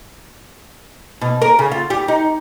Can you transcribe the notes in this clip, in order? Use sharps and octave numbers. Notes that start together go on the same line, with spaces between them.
B2
A#4
C#3
F4
G3
D#4